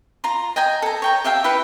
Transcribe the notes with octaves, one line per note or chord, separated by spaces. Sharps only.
F4 A#5 C6
D#5 G5 G#5 A#5
A4 A#5
C#5 G5 A#5
G4 E5 F5 G5
E4 G4 B4 F#5